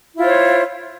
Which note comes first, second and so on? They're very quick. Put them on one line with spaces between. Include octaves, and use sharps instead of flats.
E4 F4 C5 C#5